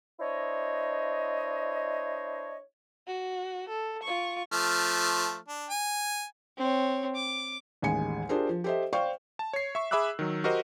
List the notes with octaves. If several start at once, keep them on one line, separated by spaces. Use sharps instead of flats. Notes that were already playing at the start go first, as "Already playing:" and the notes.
D4 E4 C5 C#5 D#5
F#4
A4
F4 C#6
F3 A3 F6
D4
G#5
C4 C#5
D6
A1 D#2 G#3 G#5 C#7
D4 F4 G4 G#4 A#4 C5
F3
G4 A4 C5 D#5 E5
C5 D5 F5 G5 C#6
A5
C#5 C7
E5 C#6
G#4 E5 B5 D6 E6 F#6
D#3 F#3
F#4 G4 A#4 C5 D#5